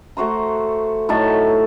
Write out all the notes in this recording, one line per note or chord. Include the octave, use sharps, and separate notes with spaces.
A3 F#4 C5 A#5
A2 F#3 D#4 A5